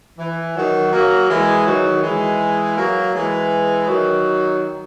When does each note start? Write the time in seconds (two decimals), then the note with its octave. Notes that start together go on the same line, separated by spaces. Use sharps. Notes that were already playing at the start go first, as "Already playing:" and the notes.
0.18 E3
0.55 D#3 F#3
0.92 F#3 A#3
1.29 E3 G#3
1.66 D#3 F#3
2.03 E3 G#3
2.77 F#3 A#3
3.14 E3 G#3
3.88 D#3 F#3